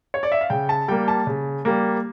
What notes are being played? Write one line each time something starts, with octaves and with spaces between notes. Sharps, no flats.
C#5
D5
E5
F5
C#3 G5
A5
G3 A#3 G5
A5
C#3
G3 A#3